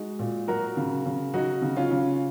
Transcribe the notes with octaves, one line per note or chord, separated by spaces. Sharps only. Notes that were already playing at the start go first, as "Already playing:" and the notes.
Already playing: G#3 D#4 F#4
A#2
F#3 F#4 A#4
C#3
C#3
F#3 D#4 F#4
C#3
C#4 F4
C#3